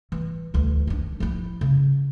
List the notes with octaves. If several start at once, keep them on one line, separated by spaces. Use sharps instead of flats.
E3
D2 E3
D#3 D4
F3 E4
C#3